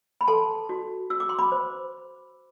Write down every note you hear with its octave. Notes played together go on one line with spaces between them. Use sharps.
B5
A4 A5 C6
F#4
F#4 E6
D6
C6
B5 D6
C5